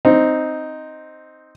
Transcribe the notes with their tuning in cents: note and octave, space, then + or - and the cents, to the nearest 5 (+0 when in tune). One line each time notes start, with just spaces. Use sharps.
C4 +0 D#4 +0